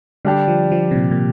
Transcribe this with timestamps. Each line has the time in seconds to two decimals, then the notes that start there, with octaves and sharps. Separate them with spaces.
0.25 D3 G3 D4 G4
0.48 F3
0.72 F3
0.91 C3
0.95 A#2
1.11 A#2